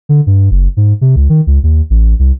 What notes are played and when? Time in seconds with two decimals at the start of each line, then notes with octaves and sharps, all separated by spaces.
0.09 D3
0.27 G2
0.51 F#1
0.77 G#2
1.01 C3
1.16 C#2
1.29 D#3
1.47 C#2
1.63 D#2
1.90 A1
2.19 C2